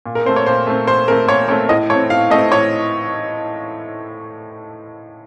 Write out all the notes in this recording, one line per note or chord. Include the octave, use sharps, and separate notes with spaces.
A#2
A#4
A3 C4 C5
C#5
A#2 C5
A3 C4
A#2 C5
A3 C4 A#4
A#2 C#5
A3 C4 C#5
A2 D#5
A3 C4 C#5
A2 F5
A3 C4 D#5
A2 C#5